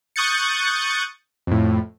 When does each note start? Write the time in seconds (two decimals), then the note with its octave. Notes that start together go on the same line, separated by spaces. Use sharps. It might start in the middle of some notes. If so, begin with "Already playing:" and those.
0.16 C#6 D#6 F#6 G6 A6 C#7
1.47 F2 A2